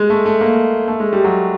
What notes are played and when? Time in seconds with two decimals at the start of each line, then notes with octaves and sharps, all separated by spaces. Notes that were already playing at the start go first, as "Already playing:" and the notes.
Already playing: G#3
0.10 A3
0.26 A3
0.41 A#3
0.88 A3
1.00 G#3
1.13 G3
1.24 F#3